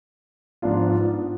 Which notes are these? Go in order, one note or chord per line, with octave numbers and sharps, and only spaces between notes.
G#2 F3 B3 D4 F4